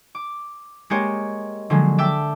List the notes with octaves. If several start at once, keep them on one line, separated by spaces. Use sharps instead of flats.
D6
G#3 A#3 G4 C5 C#5 D#5
D3 F3 F#3 G#3 A#3
E5 G5 A5 D6 E6